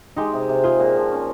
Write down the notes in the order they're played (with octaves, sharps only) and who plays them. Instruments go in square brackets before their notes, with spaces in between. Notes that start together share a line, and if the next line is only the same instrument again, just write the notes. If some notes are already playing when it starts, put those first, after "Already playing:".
[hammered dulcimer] G#3 [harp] D#4 G4
[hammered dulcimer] C3
C3
[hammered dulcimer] C4 [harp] F4 G#4
[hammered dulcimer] A#2
F3
C#4